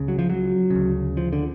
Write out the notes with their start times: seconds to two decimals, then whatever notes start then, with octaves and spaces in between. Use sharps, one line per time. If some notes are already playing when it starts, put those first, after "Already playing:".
Already playing: C#2 C#3
0.08 F#3
0.19 F3
0.30 F#3
0.70 D2 C#3
1.17 F3
1.33 D3